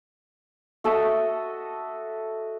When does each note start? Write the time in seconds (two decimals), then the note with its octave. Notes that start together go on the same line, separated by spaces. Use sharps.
0.84 F#4 A4 D#5 E5